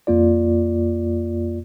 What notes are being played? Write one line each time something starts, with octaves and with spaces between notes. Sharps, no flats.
F2 A#3 F4 D5